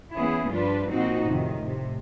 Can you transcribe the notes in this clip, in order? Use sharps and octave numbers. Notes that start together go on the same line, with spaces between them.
E3 B3 C#4 E4 G#4
G2 F3 D4 F4 B4
A#2 F3 C4 D#4 F#4
F2 A2 C3 D#3
A2 C3